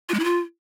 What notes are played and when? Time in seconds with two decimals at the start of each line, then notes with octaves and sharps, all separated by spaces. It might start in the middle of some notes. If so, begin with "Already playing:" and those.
0.09 F4
0.14 G#3
0.19 E4
0.24 F4